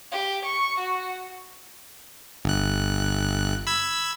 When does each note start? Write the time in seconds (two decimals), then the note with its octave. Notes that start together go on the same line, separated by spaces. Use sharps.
0.11 G4
0.45 C#6
0.79 F#4
2.45 G1 F#6
3.67 B5 E6 G#6